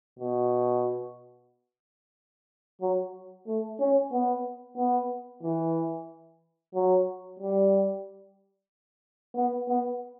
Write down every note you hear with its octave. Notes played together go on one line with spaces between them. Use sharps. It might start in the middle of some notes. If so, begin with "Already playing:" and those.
B2
F#3
A3
C#4
B3
B3
E3
F#3
G3
B3
B3